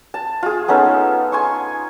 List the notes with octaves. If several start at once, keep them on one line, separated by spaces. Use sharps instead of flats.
A5
F4 G#4
B3 C#4 D#4 A4
G#5 C6 C#6